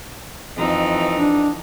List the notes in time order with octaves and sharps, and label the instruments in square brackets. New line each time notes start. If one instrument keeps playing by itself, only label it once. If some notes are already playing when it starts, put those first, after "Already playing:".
[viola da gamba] F2 E3 D#4
[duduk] D4